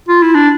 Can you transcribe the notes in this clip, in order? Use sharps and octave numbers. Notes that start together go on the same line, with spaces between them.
F4
E4
D4